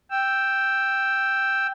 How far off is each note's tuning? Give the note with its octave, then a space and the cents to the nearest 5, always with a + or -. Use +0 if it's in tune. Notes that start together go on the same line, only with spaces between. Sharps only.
G5 +0 E6 +0